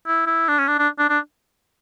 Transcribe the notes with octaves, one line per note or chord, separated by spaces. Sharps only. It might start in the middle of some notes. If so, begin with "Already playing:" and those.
E4
E4
D4
C#4
D4
D4
D4
D4